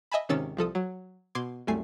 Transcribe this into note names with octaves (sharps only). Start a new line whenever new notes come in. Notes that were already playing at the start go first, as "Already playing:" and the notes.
D#5 E5 G#5 A5 B5
G#1 C3 D#3 C#4 E6 A6
C2 F3 A4 D#6
F#3
B2 C6 D6 G#6
C2 F#2 A3 G#5 C7